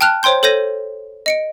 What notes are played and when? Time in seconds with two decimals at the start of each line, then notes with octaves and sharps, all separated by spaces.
0.01 G5 A5 F6 F#6 F7
0.23 C5 C#5 G5 C6 G6
0.43 A4 C5 C#5 G6 A#6 D#7
1.26 D#5 C#7 D7